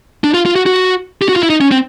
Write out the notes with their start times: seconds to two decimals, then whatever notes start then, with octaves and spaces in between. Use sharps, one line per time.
0.24 D4
0.34 F4
0.46 F4
0.56 F#4
0.66 F#4
1.22 G4
1.29 F#4
1.36 F4
1.43 E4
1.50 D#4
1.61 C#4
1.71 C4